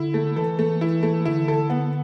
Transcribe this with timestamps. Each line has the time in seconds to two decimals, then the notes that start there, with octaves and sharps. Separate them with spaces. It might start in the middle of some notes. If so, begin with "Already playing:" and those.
Already playing: D3 E4
0.14 A3
0.36 E3 A4
0.59 A3
0.81 E4
1.03 A3
1.25 D3 E4
1.48 A4
1.70 B3